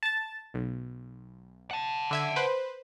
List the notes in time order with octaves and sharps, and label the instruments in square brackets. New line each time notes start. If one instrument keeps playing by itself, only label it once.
[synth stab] A5 A6
B1
[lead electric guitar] F#5 A5
[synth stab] D3 E5 G#6
B4 C5